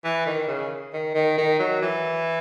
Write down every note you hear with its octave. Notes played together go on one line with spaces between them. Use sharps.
E3
D#3
C#3
D#3
D#3
D#3
F#3
E3